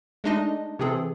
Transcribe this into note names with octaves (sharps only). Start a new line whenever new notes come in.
G#3 A3 D4 D#4 D#5
C3 E3 C4 G#4 A4